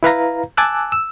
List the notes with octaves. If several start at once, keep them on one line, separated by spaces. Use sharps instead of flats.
E4 B4 F5 A#5
G#5 A5 D6 E6 F#6
E6